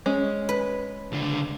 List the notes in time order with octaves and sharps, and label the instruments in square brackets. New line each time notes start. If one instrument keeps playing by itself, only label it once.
[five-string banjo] G#3 C#4
[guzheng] B4
[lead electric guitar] C#2 D3